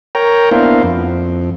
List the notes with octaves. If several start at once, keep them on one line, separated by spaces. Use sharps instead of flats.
A#4 C#5 G5 A#5
A#3 B3 D4 E4 C5 F5
F2